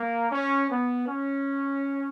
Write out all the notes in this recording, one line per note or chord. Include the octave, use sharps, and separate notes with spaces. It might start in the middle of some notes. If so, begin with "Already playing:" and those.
Already playing: A#3
C#4
B3
C#4